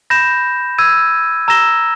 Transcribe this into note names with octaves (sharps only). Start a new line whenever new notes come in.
B5 G6 A#6 E7
E6 G#6 D#7
A#5 E6 A#6 E7 G7